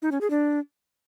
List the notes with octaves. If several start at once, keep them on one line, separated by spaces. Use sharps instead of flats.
D#4
C#4
G#4
D4